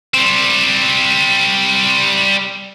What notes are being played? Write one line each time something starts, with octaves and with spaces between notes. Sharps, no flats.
G3 C4